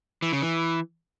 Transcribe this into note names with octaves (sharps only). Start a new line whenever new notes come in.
E3
C#3
E3